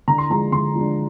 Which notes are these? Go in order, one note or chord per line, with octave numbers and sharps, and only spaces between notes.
D3 A#5
C6
F3 G#3 D4 A#5
D3 C6
F3 G#3 D4